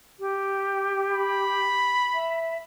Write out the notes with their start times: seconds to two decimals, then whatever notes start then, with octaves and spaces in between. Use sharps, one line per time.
0.20 G4
1.11 B5
2.14 E5